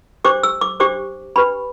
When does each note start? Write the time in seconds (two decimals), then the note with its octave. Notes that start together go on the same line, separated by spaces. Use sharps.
0.25 D4 G4 C5 D6
0.43 E6
0.61 D6
0.80 D4 G4 C5 D6
1.36 D4 G4 B4 B5